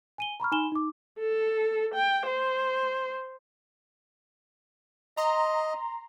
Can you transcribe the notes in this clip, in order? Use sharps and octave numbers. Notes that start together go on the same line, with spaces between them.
G#5 D#7 G7
A#5 B5 C#6 F6
D#4 G#5 B5 C6 E7 G7
D#4 D6
A4
G5
C5
D#5 A#5 C6